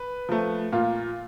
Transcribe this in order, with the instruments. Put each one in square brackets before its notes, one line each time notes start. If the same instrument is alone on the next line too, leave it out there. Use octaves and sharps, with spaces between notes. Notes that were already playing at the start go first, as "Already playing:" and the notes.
Already playing: [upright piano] B4
F3 A3
A#2 F4